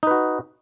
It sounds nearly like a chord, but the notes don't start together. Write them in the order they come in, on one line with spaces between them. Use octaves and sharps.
D#4 B4 F#4